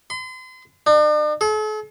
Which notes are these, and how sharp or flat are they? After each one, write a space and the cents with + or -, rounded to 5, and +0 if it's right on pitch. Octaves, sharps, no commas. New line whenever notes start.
C6 -40
D4 +45
A4 -45